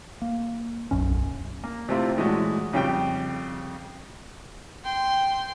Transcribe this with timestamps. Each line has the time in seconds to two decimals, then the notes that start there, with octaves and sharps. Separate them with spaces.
0.22 A#3
0.91 D1 B1 F#2 C#4
1.64 A#3
1.89 C3 A3 C4 E4 F4
2.16 A#2 E3 G#3 A3 C#4 F#4
2.73 F2 C#3 G3 G4 G5
4.85 G5 C6